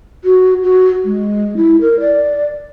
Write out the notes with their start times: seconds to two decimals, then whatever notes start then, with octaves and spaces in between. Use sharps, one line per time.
0.24 F#4
0.63 F#4
1.05 G#3
1.57 E4
1.81 A#4
2.00 D5